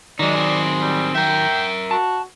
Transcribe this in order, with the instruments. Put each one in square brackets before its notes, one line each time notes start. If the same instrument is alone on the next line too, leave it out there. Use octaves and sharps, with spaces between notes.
[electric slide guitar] D#3 F#3 [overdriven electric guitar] G#3 D#4 [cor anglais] D5
[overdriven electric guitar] C4 G#4
[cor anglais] G3
[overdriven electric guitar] A#4 E5 [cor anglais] G5
[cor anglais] F#4 [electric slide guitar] A5